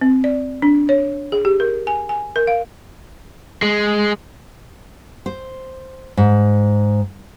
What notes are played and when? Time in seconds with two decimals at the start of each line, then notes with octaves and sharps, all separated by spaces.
0.01 C4
0.24 D5
0.62 D4
0.89 C#5
1.32 G#4
1.45 G4
1.60 A#4
1.87 G#5
2.09 G#5
2.36 A#4
2.47 F5
3.62 G#3
5.26 C5
6.17 G#2